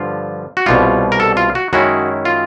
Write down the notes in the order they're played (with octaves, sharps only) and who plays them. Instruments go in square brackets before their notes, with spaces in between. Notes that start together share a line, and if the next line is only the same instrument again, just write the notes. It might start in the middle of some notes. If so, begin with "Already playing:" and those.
Already playing: [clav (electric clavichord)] G2 D3 F3 F4
F#4
C2 B2 G3 F4
A#4
A4
F4
F#4
F#2 D#3 G#3 C#4 E4 F#4
F4